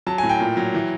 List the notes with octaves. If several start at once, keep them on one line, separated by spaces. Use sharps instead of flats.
F#3 A5
G#5
A2
G5
A#2
F#3
E3